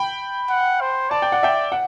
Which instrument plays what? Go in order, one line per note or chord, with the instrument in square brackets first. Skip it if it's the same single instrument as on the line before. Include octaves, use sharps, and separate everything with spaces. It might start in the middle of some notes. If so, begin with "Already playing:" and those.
Already playing: [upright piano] G5 B5
[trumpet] F#5
C5
[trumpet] D5 [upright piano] A5
[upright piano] G5
F#5
E5 G5
F#5